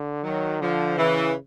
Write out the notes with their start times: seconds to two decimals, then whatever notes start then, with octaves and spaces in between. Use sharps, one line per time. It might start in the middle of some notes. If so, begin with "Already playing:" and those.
Already playing: D3
0.24 D#3 F#3
0.61 D3 F3
0.97 C#3 E3